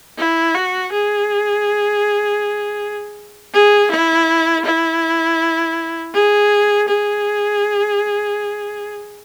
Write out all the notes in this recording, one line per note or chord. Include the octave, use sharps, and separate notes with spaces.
E4
F#4
G#4
G#4
E4
E4
G#4
G#4